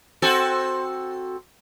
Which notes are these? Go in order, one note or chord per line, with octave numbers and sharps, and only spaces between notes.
C4 F#4 A4